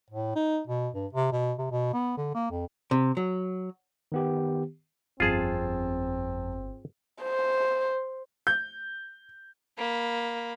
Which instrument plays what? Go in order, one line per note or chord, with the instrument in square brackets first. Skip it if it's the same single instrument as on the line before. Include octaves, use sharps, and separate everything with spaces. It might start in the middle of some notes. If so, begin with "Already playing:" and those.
[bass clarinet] A2
D#4
B2
G2
C3
B2
C3
B2
B3
D3
A#3
F2
[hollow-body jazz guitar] C3
F#3
[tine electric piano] D#3 B3 G4
[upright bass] G1 [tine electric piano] F2 A5 [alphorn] C4 [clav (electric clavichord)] F4 G#4
[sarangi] C5
[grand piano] G6
[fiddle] A#3 B5